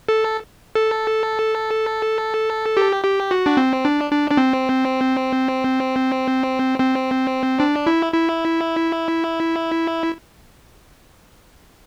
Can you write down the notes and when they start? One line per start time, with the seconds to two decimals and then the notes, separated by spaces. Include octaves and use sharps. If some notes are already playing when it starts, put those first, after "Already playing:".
0.09 A4
0.75 A4
2.77 G4
3.04 G4
3.31 F#4
3.46 D4
3.57 C4
3.85 D4
4.11 D4
4.31 D4
4.37 C4
6.79 C4
7.60 D4
7.87 E4
8.13 E4